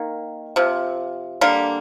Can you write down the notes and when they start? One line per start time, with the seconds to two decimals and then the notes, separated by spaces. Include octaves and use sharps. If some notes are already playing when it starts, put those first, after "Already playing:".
Already playing: D#3 A#3
0.56 C3 F3
1.41 D3 G3 A#3